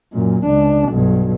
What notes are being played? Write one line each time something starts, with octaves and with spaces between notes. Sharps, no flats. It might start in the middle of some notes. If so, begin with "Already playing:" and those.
F#2 A#2
C#2 D4
B1 G2